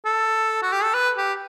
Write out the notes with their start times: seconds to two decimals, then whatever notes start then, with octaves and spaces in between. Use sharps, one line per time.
0.05 A4
0.62 F#4
0.73 G4
0.83 A4
0.94 B4
1.18 G4